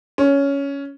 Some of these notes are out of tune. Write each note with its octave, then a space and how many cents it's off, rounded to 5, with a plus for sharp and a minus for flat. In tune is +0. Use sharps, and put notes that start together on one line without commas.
C#4 +10